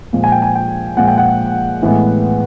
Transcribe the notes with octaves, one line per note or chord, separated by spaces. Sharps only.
A#2 F3 G#3
G#5
G5
G#5
G5
A#2 F3 G#3 F#5
G5
F#5
A2 E3 G#3 B3